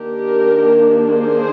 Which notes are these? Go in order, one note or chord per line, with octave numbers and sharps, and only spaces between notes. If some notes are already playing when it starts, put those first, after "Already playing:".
Already playing: D#3 A#3 D4 G4 A#4
G#4 C5